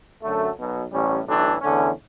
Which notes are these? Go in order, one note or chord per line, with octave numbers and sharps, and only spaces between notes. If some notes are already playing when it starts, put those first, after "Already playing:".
F#2 D3 F#3 A3
B1 B2 F#3
A1 A2 G3 C#4
B1 A2 E3 A3 D4
E2 D3 A3 C#4